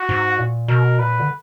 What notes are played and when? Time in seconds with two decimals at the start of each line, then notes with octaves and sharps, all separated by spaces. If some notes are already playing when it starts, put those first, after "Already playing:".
Already playing: F#4
0.09 G#2
0.39 A#2
0.68 B2 A#4
0.99 A#2 B4
1.20 D3